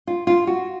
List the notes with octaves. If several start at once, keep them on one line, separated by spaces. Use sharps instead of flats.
F4
F4
F#4